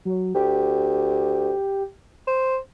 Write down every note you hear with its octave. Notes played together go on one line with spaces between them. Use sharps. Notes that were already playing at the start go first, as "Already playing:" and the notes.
F#3
D2 G4
C5